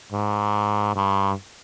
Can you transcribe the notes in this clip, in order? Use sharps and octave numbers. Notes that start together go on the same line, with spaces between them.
G#2
G2